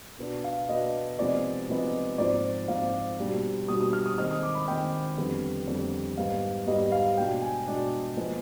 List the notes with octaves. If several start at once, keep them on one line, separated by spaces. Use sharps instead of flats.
B2 B3 D4
F5
B2 B3 D4 D#5
C3 F3 G#3 B3 D#4 D5
C3 F3 G#3 B3 D#4
G#2 F3 C4 D5
G#2 F3 C4 F5
B2 G3 D4
B2 G3 D4 D#6
D#6
F6
D#6
D#3 G#3 C4 D#4 F6
D#6
D6
B5
D#3 G#3 C4 D#4 G5
F2 D3 G3 B3
F2 D3 G3 B3
G#2 G3 B3 D#4 F5
G#2 G3 B3 D#4 D#5
F5
B2 G#3 D4 G5
G#5
B2 G#3 D4
F3 G#3 B3